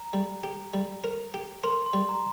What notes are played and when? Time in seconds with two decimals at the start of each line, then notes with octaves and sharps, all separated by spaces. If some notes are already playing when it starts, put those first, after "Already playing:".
Already playing: A#5
0.13 G3
0.44 G4
0.74 G3
1.04 A#4
1.34 G4
1.64 A#4 C6
1.86 C6
1.93 G3
2.09 A#5